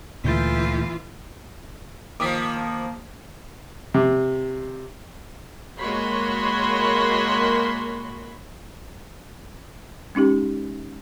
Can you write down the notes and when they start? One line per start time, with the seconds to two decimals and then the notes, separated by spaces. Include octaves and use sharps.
0.24 D2 A#2 E3 A3 F4 G6 A6
2.20 D#3 F3 A#3 D6 D#6 B6
3.94 C3
5.78 G#3 A#3 F#4 C#5 B5 C6
10.15 G#3 C#4 D#4 G4